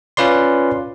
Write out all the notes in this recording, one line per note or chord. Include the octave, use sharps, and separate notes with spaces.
C#4 F4 B4 D5 C6